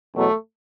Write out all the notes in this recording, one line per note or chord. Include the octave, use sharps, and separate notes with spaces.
E2 B2 F#3 A3